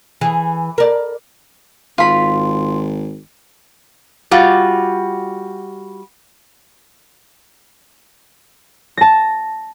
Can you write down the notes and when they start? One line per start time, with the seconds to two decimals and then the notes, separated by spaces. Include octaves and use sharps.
0.21 E3 G#4
0.78 A#4 D5
1.98 G#1 F4 B5
4.31 G3 F4 F#4
8.97 A5 A#6